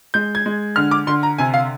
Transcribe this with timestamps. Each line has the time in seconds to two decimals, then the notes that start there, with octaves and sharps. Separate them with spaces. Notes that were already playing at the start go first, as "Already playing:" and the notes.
0.14 G#3 G6
0.35 G#6
0.46 G#3
0.76 D3 F6
0.91 D6
1.07 D3 C6
1.23 A#5
1.38 C3 G#5
1.54 F5